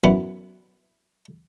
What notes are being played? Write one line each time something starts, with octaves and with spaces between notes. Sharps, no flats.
F#2 B3 E4